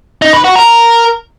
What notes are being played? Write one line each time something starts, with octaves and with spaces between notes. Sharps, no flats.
D#4
B4
F#4
A#4